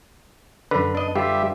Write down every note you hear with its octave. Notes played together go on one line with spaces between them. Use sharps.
F#2 D3 B4
D4 D#5
D3 G3 F4 G4 E5